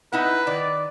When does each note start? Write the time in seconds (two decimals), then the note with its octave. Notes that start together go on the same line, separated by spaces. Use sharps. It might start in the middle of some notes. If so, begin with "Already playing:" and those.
0.13 D#4 E4 B4 F#5
0.47 D#3 D5